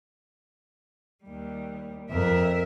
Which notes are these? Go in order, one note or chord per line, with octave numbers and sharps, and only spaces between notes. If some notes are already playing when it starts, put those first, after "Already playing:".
D#2 G3
F2 A#4 E5